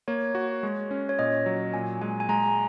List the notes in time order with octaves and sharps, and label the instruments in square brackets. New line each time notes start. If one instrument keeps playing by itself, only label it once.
[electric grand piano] A#3 [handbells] C#5
[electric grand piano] F#4
G#3
C#4
[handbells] C#5
[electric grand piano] A#2 [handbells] D#5
[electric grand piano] F#3
[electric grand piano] A#2 [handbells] G#5
[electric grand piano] G#3 [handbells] G#5
[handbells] G#5
[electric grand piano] G#3 [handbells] A#5